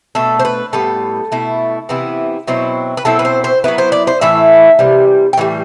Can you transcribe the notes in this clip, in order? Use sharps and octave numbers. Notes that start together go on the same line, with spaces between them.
B2 A3 D4 A4
C5
B4
A2 G3 B3 A4
B2 A3 E4
C3 E3 B3 E4
B2 F#3 C4 E4
B4
B2 F#3 C4 E4 A4
B4
C5
C5
F#3 B3 E4 B4
C5
D5
C5
A2 E3 A3 E5
C3 E3 G3
G5
A2 E3 G3